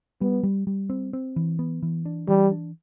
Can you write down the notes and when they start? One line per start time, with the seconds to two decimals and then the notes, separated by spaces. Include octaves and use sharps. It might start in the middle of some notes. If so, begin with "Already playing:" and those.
0.21 G3 B3
0.43 G3
0.67 G3
0.90 C4
1.13 C4
1.36 E3
1.59 B3
1.82 E3
2.05 D4
2.28 E3 G3
2.52 D4